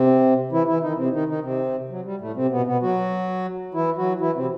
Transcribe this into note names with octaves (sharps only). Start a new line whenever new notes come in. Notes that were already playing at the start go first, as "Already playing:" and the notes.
Already playing: C3 C4
E3 E4
E3 E4
D#3 D#4
C3 C4
D#3 D#4
D#3 D#4
C3 C4
F#3
G3
A2 A3
C3 C4
B2 B3
B2 B3
F#3 F#4
E3 E4
F#3 F#4
E3 E4
C3 C4